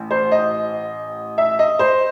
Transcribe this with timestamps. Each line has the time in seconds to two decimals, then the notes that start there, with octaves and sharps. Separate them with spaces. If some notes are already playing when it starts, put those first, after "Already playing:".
Already playing: A1
0.11 C5
0.31 D#5
1.38 E5
1.59 D#5
1.79 C5